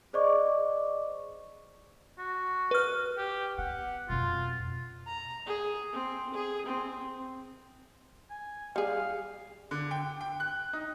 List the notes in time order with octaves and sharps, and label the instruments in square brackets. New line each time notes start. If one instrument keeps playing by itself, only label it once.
[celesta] G#4 C5 D5 D#5 C#6 D6
[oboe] F#4
[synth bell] B4 F6
[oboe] G4
[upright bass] B3 [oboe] F#5
[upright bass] F2 B2 [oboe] F4
[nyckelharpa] A#5
G#4
C4
G#4
C4
[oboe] G#5
[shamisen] G3 G#4 [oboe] F5
[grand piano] D3
G5
G5
F#6
D#4